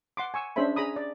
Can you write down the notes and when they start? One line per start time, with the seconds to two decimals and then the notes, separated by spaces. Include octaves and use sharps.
0.17 F#5 C6 D6
0.34 G#5 C#6 E6
0.56 C#4 D4 G#4 C5 E5 B5
0.76 G#4 A#5 B5 D#6
0.96 D5